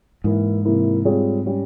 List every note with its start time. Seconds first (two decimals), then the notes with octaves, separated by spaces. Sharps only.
0.24 G#2 E3 A#3 E4
0.65 C3 E3 A#3 E4
1.05 G3 C4 F4 G#4 C#5
1.46 G3 C#4 G4